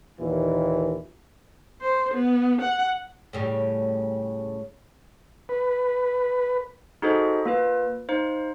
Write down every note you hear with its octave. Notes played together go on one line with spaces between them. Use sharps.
D#2 A#2 E3
C5
B3
F#5
A2 C#3 G3
B4
D#4 F#4 G#4 A4 C5 D#5
A#3 F4 B4
D#4 C5 F5